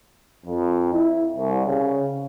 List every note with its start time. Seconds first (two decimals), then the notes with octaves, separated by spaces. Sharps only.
0.46 F2
0.93 E4
1.35 C2
1.66 C#3